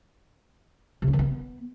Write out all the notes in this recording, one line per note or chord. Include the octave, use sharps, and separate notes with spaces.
C3
C#4
D#3
B3